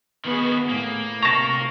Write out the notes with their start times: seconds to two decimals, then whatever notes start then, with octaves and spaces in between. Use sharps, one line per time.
0.25 D#3 B3 F#4 G#4
0.69 A2 A#3
1.23 C3 A5 A#5 C#6 A#6